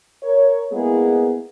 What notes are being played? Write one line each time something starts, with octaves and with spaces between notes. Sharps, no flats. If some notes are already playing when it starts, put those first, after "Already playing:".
A#4 C#5
G#3 A#3 B3 E4 G#4